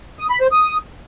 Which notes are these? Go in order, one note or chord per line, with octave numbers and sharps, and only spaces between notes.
D#6
B5
C5
D#6